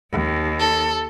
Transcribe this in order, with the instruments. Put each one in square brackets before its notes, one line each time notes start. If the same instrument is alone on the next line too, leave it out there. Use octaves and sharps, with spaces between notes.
[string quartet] D#2
[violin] A4